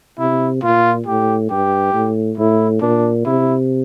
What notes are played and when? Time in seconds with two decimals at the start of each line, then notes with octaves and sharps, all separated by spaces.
0.19 C3 E4
0.63 A#2 F4
1.06 A2 G4
1.50 G2 G4
1.94 A2
2.37 A2 E4
2.81 A#2 D4
3.25 C3 E4